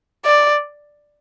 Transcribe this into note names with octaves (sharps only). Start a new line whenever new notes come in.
D5